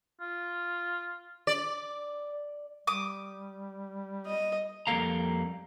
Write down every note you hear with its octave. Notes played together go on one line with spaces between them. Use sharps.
F4
D5
G3 D6 D#6
D#5
F2 G3 A#3 A4 F5 A#5